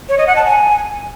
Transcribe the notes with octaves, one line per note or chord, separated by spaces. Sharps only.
C#5
D#5
F#5
A5
G#5